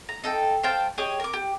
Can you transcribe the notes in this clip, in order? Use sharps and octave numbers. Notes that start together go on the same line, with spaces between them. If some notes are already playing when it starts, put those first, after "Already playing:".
A#5
D#4 A4 G5
C5 F5 G5 A5
G4 G#4 C#5 D#5
A#4 D6
G4